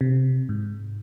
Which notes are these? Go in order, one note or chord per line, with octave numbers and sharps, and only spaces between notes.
C3
G#2